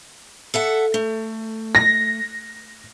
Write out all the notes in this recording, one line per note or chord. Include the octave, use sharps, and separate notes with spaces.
A4 E5 F#5
A3
A#6